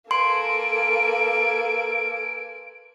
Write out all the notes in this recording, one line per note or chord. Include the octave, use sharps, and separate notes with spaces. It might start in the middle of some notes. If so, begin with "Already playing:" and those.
A#3 A4 B4 G#5 C6 D7